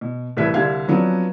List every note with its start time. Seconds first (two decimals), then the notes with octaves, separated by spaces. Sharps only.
0.01 B2
0.37 C2 A2 E3 B4 E5 G#6
0.54 C2 D3 G3 E5 F5 G#6
0.88 F3 F#3 B3 C4 D4